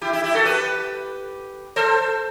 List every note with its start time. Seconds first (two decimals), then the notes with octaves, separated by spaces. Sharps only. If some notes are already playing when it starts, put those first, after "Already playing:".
0.01 E4 G4
0.13 E4 G4
0.24 E4 G4
0.34 F#4 A4
0.45 G4 B4
1.76 A4 C5